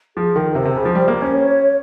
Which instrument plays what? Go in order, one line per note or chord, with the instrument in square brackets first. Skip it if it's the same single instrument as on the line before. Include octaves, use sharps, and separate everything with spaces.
[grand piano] F3 [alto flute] G#4
[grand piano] D#3 [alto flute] A#4
[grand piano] C3 [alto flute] C5
[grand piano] C3
C#3
F3
G3
A#3
C#4
[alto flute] C#5